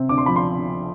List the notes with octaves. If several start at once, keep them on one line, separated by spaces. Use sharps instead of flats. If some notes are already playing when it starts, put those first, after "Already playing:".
Already playing: C3 C4
D2 D6
C6
F3 B5
C6